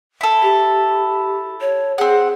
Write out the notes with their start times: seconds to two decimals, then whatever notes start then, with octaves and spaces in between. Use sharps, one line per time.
0.21 E4 A4
0.42 G4
1.61 C#5
1.98 C4 G#4 F#5